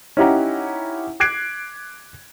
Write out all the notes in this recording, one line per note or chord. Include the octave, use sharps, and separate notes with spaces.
C#4 D#4 E4 G4 F#5 A#5
D6 F#6 G#6 C7 D7